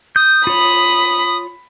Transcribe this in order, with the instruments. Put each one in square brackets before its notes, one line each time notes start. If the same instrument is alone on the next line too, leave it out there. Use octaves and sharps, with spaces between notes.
[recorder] D#6 [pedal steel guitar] G6
[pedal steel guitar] F4 C#5 [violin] B5